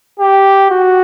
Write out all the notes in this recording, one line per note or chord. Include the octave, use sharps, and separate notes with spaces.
G4
F#4